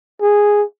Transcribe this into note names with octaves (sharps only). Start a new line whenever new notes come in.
G#4